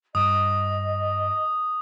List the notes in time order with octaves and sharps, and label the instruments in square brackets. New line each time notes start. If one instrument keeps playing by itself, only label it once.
[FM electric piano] G2 [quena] D#5 [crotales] D#6